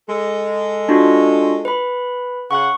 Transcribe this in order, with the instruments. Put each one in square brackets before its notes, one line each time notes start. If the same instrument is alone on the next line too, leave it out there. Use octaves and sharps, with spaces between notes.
[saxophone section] G#3 A4
[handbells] D4 F4 F#4
B4 B5
[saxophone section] C#3 F#5 [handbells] C#6